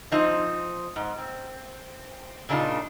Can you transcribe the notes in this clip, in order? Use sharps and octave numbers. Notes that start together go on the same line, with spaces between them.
F3 C4 D#4
G#2
C4
A#2 C#3 D4 D#4 F4